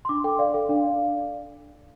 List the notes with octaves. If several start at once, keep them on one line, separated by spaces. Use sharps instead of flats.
C6
D4 D6
A4 G5
D5 F5
A4 F5
D4
D5